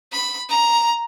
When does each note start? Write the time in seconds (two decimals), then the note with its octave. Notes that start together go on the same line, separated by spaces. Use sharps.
0.12 B5
0.49 A#5